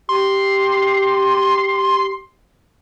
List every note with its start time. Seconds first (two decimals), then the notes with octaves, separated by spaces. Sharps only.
0.09 G4 C6